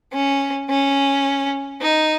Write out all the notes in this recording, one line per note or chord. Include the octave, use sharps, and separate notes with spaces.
C#4
C#4
D#4